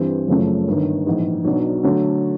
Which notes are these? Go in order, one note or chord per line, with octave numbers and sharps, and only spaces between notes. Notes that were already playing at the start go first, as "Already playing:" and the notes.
Already playing: G2 E3 G3 C4
F#1 F#2 C#3 F3 A3
G1 G2 D#3
A#1 G#2 E3
B1 B2 F#3 B3 D4
D3 F#3 A3